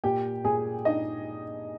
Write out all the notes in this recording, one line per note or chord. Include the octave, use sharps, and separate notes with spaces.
A#2 G4 G5
A#2 G#4 G#5
D4 D#4 D#5